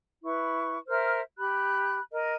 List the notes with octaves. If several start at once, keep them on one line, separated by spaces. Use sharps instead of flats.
E4 B4 C#6
A#4 C5 E5 F6
G4 B5 F#6
A#4 D#5